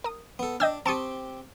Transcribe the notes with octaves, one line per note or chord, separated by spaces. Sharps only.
A#4 D#6
B3 A4
D4 D#5 G5 E6
C4 G4 A5 C#6 D#6